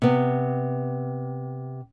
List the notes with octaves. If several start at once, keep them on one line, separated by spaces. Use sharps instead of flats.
C3 B3